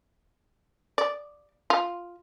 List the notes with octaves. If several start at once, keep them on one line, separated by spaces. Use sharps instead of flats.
D5
F4